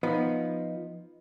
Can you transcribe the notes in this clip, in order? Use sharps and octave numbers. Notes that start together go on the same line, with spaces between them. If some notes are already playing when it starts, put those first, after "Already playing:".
F3 B3 D#4